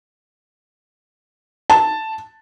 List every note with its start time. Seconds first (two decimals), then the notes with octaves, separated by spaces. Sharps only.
1.70 A5